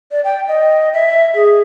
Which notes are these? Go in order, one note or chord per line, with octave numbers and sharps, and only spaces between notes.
D5
G5
D#5
E5
G#4